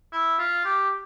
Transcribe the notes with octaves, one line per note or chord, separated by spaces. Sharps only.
E4
F4
G4